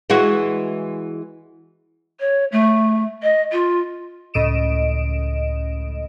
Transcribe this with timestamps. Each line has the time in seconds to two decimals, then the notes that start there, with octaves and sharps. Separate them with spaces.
0.10 E3 G#3 F#4
2.20 C#5
2.52 A3
3.23 D#5
3.52 F4
4.34 C#2 A2 D#5 D7 E7